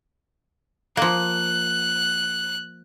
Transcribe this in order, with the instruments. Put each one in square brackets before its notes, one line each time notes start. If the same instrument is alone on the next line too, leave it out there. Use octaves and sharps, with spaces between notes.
[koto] F3 A#3 [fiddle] F#6